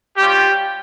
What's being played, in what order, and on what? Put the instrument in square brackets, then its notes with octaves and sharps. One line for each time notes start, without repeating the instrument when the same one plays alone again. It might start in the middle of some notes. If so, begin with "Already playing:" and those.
[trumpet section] G3 C#4 F4 G4